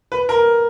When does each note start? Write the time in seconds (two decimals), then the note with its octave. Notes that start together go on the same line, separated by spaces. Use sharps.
0.12 B4
0.29 A#4